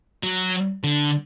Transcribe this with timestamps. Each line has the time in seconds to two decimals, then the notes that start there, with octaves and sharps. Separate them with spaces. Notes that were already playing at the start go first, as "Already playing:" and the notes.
0.23 F#3
0.84 D3